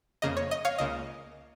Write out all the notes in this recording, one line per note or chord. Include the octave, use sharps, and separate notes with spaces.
F2 C#3 A#3 D#5
C#5
D#5
C#5 F5
C#2 C#3 A#3 D#5